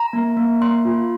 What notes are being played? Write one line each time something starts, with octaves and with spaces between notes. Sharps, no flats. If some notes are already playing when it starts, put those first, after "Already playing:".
Already playing: A#5
A#3
A#3
A#3 C6
F4